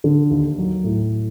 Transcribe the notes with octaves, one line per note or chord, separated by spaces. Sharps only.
D3
D#2
F#3
A2